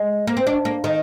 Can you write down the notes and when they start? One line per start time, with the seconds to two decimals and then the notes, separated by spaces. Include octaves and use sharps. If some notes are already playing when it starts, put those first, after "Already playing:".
Already playing: G#3
0.27 A#3
0.37 C4
0.47 D4
0.65 A#3
0.84 D#3